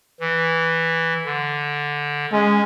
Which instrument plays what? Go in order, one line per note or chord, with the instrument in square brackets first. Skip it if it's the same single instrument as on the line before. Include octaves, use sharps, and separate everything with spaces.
[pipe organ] E3
D3
[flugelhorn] G#3 [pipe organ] C#4